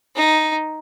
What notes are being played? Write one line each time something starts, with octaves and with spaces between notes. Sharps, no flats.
D#4